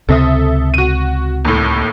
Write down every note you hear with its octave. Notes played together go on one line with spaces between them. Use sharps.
C#2 C3 C4 A4 E5 D#6
F#4 D#7
D#2 A2